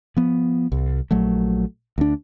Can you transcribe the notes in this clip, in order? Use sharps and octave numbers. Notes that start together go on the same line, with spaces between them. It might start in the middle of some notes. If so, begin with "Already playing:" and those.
F3 B3
C2
A#1 F#3 A3
D2 D4